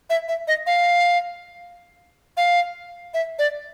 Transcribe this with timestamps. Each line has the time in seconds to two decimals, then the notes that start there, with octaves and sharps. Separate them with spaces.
0.10 E5
0.28 E5
0.47 D#5
0.67 F5
2.37 F5
3.14 E5
3.39 D5